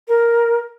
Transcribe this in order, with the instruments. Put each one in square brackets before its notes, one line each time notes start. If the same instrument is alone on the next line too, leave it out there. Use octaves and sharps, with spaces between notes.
[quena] A#4